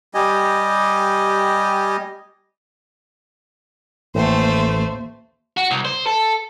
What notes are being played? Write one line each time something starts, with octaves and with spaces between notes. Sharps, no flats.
G3 G4 D#5 G#5
A1 D#2 A3 C5
F#4
C2
C5
A4